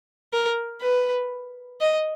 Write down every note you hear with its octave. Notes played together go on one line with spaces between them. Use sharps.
A#4
B4
D#5